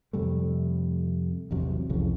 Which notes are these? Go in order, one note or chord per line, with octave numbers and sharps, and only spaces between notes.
F2 C3 G3 A3
A1 E2 C3 F#3
C2 F2 A2 C#3